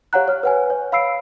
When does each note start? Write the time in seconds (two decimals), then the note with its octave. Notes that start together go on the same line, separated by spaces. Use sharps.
0.13 G4 C#5 F5 F#5 A#5 F#6
0.28 C#5 F6
0.43 B4 F#5 G#5
0.70 C#5
0.92 F5 B5 E6 C7 D7